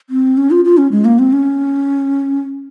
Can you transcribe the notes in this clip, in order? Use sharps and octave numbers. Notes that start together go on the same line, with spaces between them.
C4
C#4
F4
F4
C#4
G#3
A#3
C4
C#4